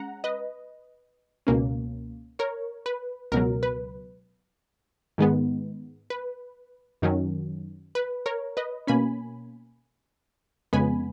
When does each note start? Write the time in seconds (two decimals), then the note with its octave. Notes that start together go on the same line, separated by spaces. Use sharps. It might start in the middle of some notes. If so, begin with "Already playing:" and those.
Already playing: G#3 C#4 F#5 A#5
0.24 B4 D#5
1.47 C#2 B2 A#3 C#4
2.39 A#4 C#5
2.86 B4
3.32 C#2 B2 F#3 A#4
3.63 B4
5.18 G#2 D#3 G#3 B3
6.10 B4
7.02 F#2 D#3 F#3 C#4
7.95 B4
8.26 A#4 C#5
8.57 B4 D#5
8.87 B2 A#3 C#4 G#5 B5
10.73 F2 C#3 G#3 B3 G#5 B5